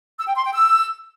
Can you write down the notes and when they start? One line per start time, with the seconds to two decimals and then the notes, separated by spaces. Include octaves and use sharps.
0.18 E6
0.26 G5
0.35 C6
0.44 G5
0.53 E6